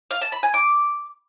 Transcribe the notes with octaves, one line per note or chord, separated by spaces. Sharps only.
F5
A5
B5
G#5
D6